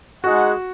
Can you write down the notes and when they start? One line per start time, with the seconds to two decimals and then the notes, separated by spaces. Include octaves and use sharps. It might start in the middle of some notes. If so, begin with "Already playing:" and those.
0.24 G#3 D#4 F#4 G#4 D#5 F#5